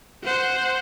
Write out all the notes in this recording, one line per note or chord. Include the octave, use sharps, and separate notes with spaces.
C5 F#5